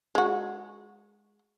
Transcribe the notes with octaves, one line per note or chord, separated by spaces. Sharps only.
G#3 F#4